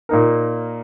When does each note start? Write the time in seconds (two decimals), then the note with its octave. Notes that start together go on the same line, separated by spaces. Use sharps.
0.09 A#2 A#3 D#4 A#4